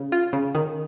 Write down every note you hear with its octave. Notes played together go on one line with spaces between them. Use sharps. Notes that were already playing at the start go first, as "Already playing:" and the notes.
Already playing: C#3
F4
C#3
D#3